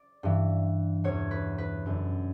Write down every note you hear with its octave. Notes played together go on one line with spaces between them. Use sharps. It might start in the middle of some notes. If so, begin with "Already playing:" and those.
Already playing: D5
G2 E3
E2 B2 C#5
B4
B4
F#2 D3